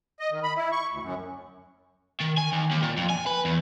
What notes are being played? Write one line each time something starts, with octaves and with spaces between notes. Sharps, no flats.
D#5
D#3
B5
E4
C#6
D2
F#2
D#3
G#5
D#2
D#2
A#2
F2
G#5
B4
E2